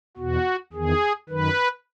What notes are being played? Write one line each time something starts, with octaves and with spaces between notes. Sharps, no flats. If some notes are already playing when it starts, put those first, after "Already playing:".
E2 B2 F#4
E2 D#3 G#4
F#2 D#3 B4